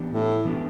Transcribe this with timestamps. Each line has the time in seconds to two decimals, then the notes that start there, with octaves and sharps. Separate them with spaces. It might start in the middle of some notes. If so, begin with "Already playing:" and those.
Already playing: E3 B3 D4 G4
0.10 A2
0.45 E3 B3 D4 G4